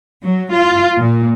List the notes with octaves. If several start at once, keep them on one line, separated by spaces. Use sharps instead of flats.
F#3
F4
A#2